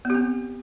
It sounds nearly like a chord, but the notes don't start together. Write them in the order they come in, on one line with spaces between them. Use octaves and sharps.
B3 G4 C4